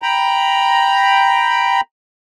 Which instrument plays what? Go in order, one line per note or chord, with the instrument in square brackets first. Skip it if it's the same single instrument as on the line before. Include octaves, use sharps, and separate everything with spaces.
[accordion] G5 A#5 B5